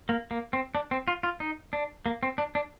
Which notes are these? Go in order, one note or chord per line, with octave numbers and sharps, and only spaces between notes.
A#3
A#3
C4
D4
C4
F4
F4
D#4
D4
A#3
C4
D4
D4